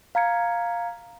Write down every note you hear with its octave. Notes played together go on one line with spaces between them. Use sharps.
F5 A#5 G#6 C#7